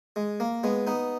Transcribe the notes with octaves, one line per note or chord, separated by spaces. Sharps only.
G#3
A#3
G#3 B3
B3 D#4